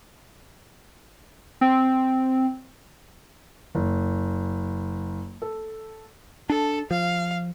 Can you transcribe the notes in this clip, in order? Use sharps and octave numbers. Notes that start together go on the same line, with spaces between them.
C4
F#1
A4
D4 A4
F3 F5